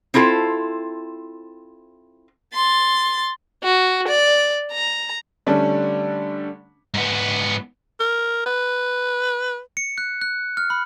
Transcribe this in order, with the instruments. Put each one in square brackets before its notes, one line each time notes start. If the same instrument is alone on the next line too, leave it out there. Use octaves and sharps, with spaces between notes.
[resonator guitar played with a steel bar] C4 E4 F4 A4 C5
[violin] C6 A6
F#4
D5
A#5
[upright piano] D3 G3 A3 C#4 D4
[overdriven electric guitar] G#2 B3
[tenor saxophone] A#4
B4
[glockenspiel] C#7
F#6
F#6
F6
B5